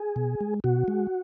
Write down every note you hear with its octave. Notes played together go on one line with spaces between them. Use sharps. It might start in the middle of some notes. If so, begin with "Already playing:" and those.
Already playing: G#4
B2
G#3
B2 F#4
G#3